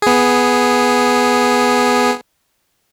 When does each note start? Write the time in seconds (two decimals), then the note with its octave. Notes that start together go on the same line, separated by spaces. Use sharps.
0.02 B3 G#4